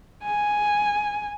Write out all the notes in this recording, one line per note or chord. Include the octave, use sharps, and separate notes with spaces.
G#5